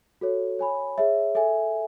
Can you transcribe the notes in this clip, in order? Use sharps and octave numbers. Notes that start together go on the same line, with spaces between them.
F#4 A4 C#5
C#5 G#5 B5
G#4 C#5 E5
A4 E5 G#5